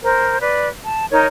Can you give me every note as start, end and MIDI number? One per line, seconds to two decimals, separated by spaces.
0.03 0.38 70
0.03 0.38 72
0.40 0.68 71
0.40 0.68 74
0.85 1.05 81
1.10 1.25 63
1.10 1.25 70
1.10 1.25 73